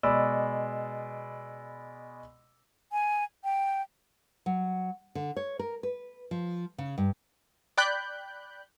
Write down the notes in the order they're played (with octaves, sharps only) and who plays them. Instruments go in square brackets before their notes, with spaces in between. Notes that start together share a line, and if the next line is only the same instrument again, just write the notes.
[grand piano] B2 G#3 D5 B5 E6
[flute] G#5
G5
[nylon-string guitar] F#3
D3
C#5
A#4
B4
F3
C#3
G2
[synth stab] D5 G5 B5 F#6 G6